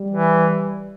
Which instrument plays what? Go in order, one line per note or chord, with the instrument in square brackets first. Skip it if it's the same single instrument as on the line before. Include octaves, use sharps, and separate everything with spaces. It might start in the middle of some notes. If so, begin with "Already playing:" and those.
Already playing: [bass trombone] G3
[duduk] E3